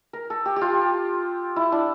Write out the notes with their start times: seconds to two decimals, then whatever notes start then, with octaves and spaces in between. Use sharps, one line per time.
0.13 A#4
0.30 A4
0.46 G4
0.56 G4
0.61 F4
1.56 E4
1.72 D4